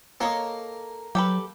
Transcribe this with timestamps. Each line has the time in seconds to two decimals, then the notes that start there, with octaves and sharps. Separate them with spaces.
0.21 A#3 A4 C#5 D#5
1.15 F#3 G4 A4 B4